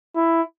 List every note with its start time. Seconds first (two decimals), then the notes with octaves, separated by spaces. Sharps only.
0.16 E4